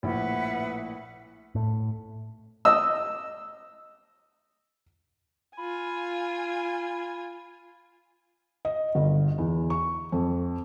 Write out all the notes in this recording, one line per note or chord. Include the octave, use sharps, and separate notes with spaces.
A#1 A2 B4 E5 F#5 B5
A2
D#5 E6
F4 G#5 B5
D#5
G1
E2
C#6
F2